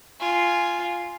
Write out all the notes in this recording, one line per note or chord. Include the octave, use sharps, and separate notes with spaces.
F4 G#5